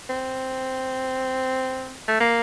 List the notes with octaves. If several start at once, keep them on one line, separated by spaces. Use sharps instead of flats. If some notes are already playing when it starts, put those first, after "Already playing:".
C4
A3
A#3